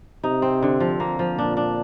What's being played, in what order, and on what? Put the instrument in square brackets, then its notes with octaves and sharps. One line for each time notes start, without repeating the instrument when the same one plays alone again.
[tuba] C3 [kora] D#4
[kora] C4
D3
F3
A#3
F3
[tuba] A#2 [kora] D4
[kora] D4